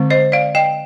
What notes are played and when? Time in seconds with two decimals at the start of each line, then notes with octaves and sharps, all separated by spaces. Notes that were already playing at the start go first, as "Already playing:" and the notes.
Already playing: D3 G#3 C4
0.10 C5 D#5
0.32 D5 F5
0.55 D#5 G5